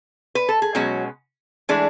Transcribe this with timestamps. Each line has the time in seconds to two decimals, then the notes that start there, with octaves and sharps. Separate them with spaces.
0.35 B4
0.49 A4
0.62 G#4
0.75 B2 F#3 G#3 C#4 F#4
1.69 E3 G#3 A3 D4 G#4